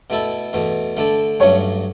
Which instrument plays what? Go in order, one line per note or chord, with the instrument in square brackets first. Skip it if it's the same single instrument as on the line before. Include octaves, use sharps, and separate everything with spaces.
[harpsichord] B2 A3 E4 A4
E2 B2 A3
D3 A3 D4 A4
[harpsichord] G2 F#3 A3 C#4 [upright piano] C#5